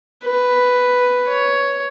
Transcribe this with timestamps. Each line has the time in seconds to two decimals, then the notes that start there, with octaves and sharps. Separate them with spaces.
0.25 B4
1.28 C#5